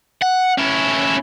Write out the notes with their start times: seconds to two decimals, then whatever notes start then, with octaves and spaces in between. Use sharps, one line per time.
0.22 F#5
0.58 C#4 E4